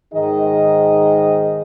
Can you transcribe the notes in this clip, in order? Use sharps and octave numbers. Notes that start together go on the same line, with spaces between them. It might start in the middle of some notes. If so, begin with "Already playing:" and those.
G#2 D#3 D#4 G#4 D#5